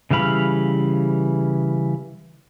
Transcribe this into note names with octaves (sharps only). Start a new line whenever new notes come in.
C#3 E3 G3 F5 B5